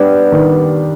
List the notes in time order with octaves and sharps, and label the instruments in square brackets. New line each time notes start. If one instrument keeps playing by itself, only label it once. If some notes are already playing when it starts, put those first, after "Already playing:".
Already playing: [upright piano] G3 D4 [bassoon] B3
[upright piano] D#3